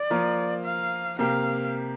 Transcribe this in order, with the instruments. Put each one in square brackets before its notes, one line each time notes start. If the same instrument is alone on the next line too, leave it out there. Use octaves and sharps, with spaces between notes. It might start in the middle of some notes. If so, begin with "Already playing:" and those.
Already playing: [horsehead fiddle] D5
[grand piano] F3 A#3 F4 A#4
[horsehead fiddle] F5
[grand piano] C3 A#3 G4 A#4 [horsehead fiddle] F5